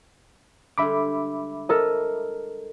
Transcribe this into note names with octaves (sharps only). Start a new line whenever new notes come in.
D3 G3 G#3 E5 B5 D6
A4 A#4 D#5